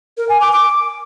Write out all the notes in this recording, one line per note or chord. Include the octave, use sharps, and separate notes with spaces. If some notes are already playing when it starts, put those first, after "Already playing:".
A#4
G#5
D6
D6